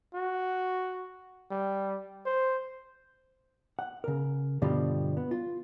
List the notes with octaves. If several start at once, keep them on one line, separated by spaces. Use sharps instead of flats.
F#4
G3
C5
F#5
C#3 A#4
G2 B2 D3 F3 G3
B3
F4